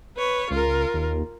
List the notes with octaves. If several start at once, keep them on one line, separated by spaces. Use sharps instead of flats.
B4 C#5
C#2 F4 A#4
D#2